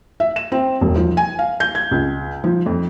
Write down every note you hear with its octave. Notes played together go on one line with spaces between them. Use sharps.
E5
E7
C4
E1
F3
G#5
F5
G6
G#6
C#2
F3
F2